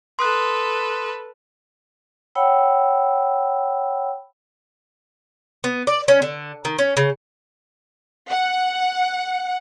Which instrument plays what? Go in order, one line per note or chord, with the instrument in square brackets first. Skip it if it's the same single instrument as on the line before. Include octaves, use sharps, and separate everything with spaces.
[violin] A4 B4 [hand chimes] C6 D#6 F#6
[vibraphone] C#5 F#5 G5 B5 E6
[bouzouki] B3
D5
C#4
D3
D#3
C#4
C#3
[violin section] F#5